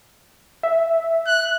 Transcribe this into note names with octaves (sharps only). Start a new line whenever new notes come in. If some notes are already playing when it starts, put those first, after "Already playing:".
E5
F#6